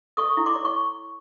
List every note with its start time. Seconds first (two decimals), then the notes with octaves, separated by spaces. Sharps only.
0.17 A4 C#6 D#6
0.37 E4
0.46 C6 D6
0.55 C#5
0.65 C#6